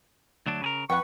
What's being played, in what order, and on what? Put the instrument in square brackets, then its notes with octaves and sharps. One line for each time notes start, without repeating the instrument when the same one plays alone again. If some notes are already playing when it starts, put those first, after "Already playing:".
[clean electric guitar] D2 F#3 D4
C#3 G#4 A#4
[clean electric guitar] F2 [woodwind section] B4 C#6 [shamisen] F#5 G5